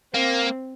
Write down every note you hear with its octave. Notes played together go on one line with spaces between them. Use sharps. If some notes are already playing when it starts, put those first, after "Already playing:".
A#3 C4